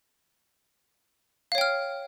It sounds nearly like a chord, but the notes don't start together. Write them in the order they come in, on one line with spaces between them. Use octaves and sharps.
F5 C#5 G5 F6